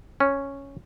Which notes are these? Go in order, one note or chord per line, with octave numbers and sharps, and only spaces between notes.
C#4